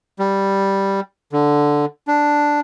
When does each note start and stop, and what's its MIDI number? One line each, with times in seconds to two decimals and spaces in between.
0.19 1.00 55
1.33 1.85 50
2.08 2.60 62